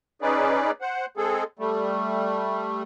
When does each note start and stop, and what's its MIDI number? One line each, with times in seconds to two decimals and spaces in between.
0.22 0.71 61
0.22 0.71 63
0.22 0.71 68
0.22 0.71 71
0.22 0.71 74
0.81 1.06 72
0.81 1.06 78
1.17 1.44 56
1.17 1.44 60
1.17 1.44 68
1.17 1.44 69
1.59 2.83 55
1.59 2.83 57